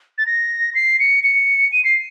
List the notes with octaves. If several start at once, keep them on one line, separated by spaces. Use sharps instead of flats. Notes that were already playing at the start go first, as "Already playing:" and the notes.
A6
A#6
C7
C#7
C#7
D#7
C7